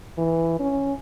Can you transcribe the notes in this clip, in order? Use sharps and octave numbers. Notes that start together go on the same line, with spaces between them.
E3
C#4